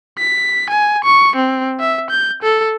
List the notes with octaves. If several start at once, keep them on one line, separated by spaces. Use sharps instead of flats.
B6
G#5
C#6
C4
E5
G6
A4